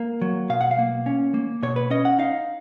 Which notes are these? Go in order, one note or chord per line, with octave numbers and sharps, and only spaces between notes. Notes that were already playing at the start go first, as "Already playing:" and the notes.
Already playing: A#3
F#3
B2 F5
F#5
F5
A#3
C#4
A#3
B2 C#5
B4
C#4 D#5
F#5
D#4 F5